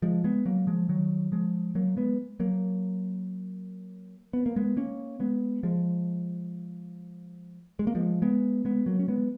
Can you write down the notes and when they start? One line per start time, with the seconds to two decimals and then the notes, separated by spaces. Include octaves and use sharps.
0.02 F3 G#3
0.24 G#3 B3
0.46 F#3 A#3
0.67 F3 G#3
0.89 D#3 F#3
1.32 F3 G#3
1.75 F#3 A#3
1.97 G#3 B3
2.40 F#3 A#3
4.33 B3
4.46 A#3
4.56 G#3 B3
4.77 A#3 C#4
5.20 G#3 B3
5.63 F3 G#3
7.79 G#3
7.87 A#3
7.95 F3 G#3
8.22 G#3 B3
8.65 G#3 B3
8.86 F#3 A#3
8.99 C#4
9.08 G#3 B3